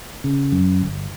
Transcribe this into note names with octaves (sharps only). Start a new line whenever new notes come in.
C#3
F#2
G1